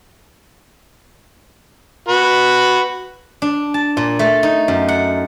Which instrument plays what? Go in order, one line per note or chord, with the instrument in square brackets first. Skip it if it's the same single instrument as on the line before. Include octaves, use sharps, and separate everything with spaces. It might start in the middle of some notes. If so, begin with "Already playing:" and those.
[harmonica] F#4 B4
[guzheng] D4
A5
A#2
A3
D#4
F#2
F#5